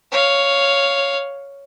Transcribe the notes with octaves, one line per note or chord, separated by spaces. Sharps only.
C#5 F5